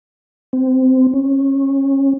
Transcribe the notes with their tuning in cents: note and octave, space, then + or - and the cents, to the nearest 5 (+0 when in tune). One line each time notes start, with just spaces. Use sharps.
C4 -15
C#4 -25